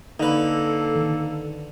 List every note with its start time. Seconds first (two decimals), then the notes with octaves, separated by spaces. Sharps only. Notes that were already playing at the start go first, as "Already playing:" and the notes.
0.20 D3 A#3 D#4 A4 B4 D#5
0.95 D#3